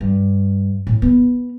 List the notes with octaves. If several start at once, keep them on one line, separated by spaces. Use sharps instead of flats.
G2
A2
B3